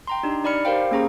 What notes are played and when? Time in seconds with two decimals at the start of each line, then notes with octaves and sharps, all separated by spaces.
0.07 G5 A#5 C6
0.23 D4 D#4 G4
0.44 D#4 D5 B5 F6 C#7
0.65 G4 A#4 C5 F5 G5
0.91 A#3 C#4 G#4 A#5 C#6